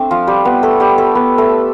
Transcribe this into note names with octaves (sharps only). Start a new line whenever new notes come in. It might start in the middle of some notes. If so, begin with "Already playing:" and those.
Already playing: A3 C4 D4 A4
F3 F4
G3 G4
B3 B4
A3 A4
G3 G4
A3 A4
B3 B4
A3 A4